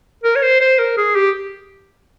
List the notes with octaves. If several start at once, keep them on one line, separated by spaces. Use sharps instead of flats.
A#4
C#5
C5
C5
A#4
G#4
G4